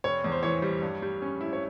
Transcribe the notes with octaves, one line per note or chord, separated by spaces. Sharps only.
F1 C#5
E2
C5
E3 C#5
G3
G2
G3
C#4
E4
C#5